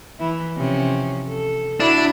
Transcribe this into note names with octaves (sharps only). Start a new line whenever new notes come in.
E3 E4
C3 F3 C#4
A4
D4 E4 F#4